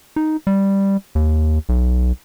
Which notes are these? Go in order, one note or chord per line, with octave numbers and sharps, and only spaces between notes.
D#4
G3
D#2
B1